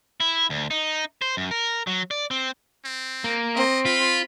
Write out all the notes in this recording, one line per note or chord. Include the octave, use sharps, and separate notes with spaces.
E4
D2
D#4
C5
F#2
A#4
F#3
D5
C4
C4
A#3
C4 D#5
F4 B5